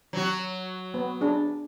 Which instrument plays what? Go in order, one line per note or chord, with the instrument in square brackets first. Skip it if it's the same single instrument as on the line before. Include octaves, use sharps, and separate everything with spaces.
[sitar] F#3 F#4
[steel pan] B3
C#4 D4 G#4